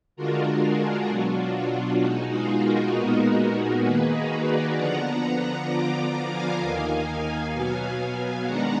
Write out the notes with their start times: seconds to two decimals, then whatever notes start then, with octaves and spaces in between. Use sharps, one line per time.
0.16 D3 G#3 D4 F4 F#4 A#4
0.62 F4 G#4
1.08 B2 F#3 D4 F4 F#4
1.55 F4
2.00 B2 G#3 D#4 F#4
2.32 F4 G#4
2.62 F#4 A#4
2.93 A#2 G#3 B3 D#4 F#4 A#4
3.85 D#3 A#3 D#4 G#4 B4
4.15 F#4 A#4
4.46 A#4 D5
4.76 D3 F3 B3 D4 F#5 A#5
5.68 D3 F3 B3 D4 F4 A#5 D6
6.30 F5 G#5
6.61 D#2 D#3 A#3 D#4
7.53 B2 F#3 B3
8.45 D#3 G#3 B3 D4 F#5 A#5